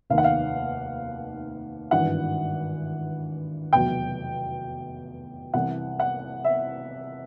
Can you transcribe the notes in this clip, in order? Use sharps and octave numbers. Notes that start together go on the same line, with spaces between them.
F1 D#2 D#3 F5
F#5
F5
G#1 G2 E3 F#5
F1 E2 B2 F#3 G5
C2 C3 E3 F#5
F#5
E5